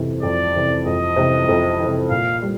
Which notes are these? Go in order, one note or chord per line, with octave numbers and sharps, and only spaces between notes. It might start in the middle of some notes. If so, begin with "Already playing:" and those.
Already playing: F2 C3 E3
F2 D5
C3 E3
F2 D#5
C3 E3
F2
C3 E3
A#2 F5
G3